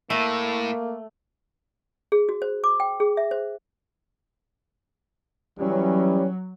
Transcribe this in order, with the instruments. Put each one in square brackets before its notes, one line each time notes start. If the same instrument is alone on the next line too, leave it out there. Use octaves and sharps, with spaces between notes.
[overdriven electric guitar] A2 [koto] A3 [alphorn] A#3
[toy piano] G#4
F#4
C5
D6
G5
G#4
E5
C5
[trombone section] E3 C#4 [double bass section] F#3 [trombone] G3